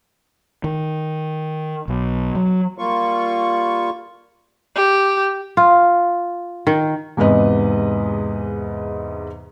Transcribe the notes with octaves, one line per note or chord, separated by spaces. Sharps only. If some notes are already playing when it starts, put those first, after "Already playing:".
D#3
B1
F#3
G3 A#3 F4 C#6
G4
F4
D#3
E2 G#2 C3 B4 D#5